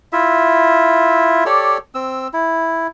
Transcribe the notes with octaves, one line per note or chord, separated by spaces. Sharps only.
E4 F4 E5
G4 A4 C#5 D5
C4 E6
E4